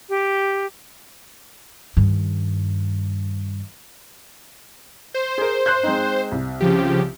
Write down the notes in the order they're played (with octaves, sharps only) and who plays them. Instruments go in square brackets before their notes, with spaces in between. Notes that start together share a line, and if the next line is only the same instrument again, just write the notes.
[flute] G4
[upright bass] G2 D#3
[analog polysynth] C5
[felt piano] G#4 A#4
C6 F#6 G6
G#3 C4 D#4
C2
[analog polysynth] C#3 F3 G4